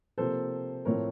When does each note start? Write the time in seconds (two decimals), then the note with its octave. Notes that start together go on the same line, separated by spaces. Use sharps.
0.18 C3 F3 A#3 A4 C5
0.85 A2 F3 A3 C4 A#4 C#5